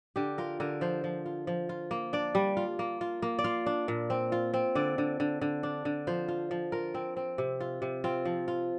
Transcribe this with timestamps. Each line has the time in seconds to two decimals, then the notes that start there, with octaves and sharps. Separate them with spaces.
0.16 D3 G4
0.38 F4 A#4
0.60 D3 A#4
0.81 F3 C5
1.04 F3
1.26 F4
1.47 F3
1.69 F4
1.91 A#3
2.13 D4 D5
2.35 G3
2.57 F4
2.79 A#3
3.01 F4
3.22 A#3
3.39 D5
3.44 F4 F5
3.66 D4
3.88 A#2
4.10 C4
4.32 F4
4.54 C4
4.75 D3 D5
4.98 D3
5.20 D3
5.41 D3
5.63 D4
5.85 D3
6.07 F3 C5
6.28 F4
6.51 F3
6.72 F4 A#4
6.94 C4
7.17 C4
7.38 C3
7.60 F4
7.82 C3
8.04 C4 F4
8.25 F3
8.48 F4